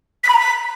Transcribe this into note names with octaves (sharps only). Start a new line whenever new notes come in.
B6
B5
A#5
B6